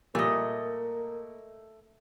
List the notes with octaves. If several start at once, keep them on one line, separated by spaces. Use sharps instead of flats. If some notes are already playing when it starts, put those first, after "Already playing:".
A#2 G3 A3 A#3 D#5